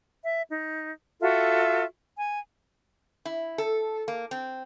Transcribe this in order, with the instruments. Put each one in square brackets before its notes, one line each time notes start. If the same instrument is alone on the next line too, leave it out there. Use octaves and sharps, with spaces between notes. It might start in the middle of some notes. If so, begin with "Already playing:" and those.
[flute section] E5
D#4
F4 F#4 A4 E5
G#5
[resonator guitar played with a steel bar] E4
A4
A#3
C4